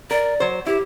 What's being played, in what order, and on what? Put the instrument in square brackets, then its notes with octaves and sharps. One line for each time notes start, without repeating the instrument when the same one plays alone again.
[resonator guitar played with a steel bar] A#4 [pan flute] D5
[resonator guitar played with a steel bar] F#3 C5
[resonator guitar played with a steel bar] E4 [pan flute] G4